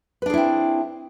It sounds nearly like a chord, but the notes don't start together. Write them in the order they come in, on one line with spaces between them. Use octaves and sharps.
B4 D4 G#4 E4 C4